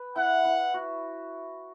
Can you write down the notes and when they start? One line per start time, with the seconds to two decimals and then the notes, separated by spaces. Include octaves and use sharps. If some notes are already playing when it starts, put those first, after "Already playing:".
Already playing: B4
0.16 E4 F#5
0.45 E4
0.74 F#4